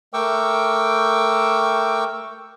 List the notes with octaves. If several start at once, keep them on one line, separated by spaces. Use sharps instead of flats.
A3 A#4 G5 C#6 D6 E6